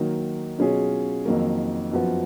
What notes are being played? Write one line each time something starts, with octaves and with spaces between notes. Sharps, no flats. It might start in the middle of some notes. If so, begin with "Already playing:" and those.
Already playing: D#3 F#3 A#3 D#4
B2 F#3 C#4 F4 G#4
F2 D#3 F#3 A#3
F#2 F3 B3 F#4